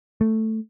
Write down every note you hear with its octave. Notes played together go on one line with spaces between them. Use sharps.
A3